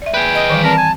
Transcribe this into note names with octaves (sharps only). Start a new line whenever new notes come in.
D5 E5
G#4 B4 G5
D#5
D#3 E3 G3
C4 A#4 D5 A5 A#5
G#5